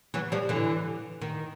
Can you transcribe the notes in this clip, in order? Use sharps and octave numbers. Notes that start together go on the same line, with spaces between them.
E3 F#3
F3 G3
D3 E3
D#3